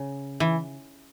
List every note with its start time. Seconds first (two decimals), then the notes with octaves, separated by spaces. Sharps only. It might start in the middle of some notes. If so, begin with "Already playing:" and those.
Already playing: C#3
0.40 E3